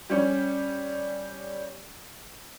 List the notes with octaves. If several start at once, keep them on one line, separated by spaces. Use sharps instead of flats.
G3 C#4